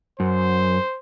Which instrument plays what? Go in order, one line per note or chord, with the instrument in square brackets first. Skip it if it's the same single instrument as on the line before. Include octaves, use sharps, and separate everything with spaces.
[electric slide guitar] F#2 [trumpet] C5